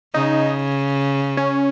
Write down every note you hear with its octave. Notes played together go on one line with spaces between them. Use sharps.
C#3 D#4
C#4